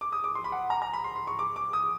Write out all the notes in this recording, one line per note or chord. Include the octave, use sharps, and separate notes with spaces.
D6
D#6
D6
C6
B5
F#5
A#5
A#5
B5
C6
C6
C#6
D6
D6
D#6